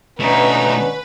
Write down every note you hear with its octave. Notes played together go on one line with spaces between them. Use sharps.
B2 D3 A3 C#4 D#4 B4